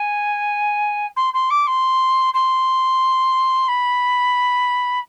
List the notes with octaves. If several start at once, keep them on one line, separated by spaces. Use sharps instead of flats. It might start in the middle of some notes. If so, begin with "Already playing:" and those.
Already playing: G#5
C6
C6
D6
C6
C6
B5